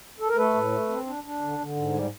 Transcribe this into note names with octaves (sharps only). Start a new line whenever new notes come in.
A4
A#4
A3 A4 B4
A2
A3
C4
D4
D4
D3
D3
G#2
G3